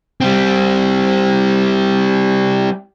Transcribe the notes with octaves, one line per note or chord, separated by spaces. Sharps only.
G3 C4